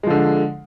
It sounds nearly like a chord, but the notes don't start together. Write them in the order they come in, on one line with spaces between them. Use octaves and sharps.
G#3 F3 D3